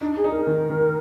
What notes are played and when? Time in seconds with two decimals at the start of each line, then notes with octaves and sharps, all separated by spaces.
0.01 D4 D#4
0.16 G#4
0.24 D#4
0.31 A#4
0.47 D#3
0.70 D#3